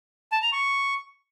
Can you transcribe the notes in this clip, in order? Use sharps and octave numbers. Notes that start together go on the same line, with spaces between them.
A5
A#5
C#6